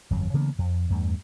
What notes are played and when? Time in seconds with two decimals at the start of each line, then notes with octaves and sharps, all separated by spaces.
0.11 G1 F2 F#3
0.34 C#3 E3 A#3 B3
0.59 F2
0.90 E2 G2 A3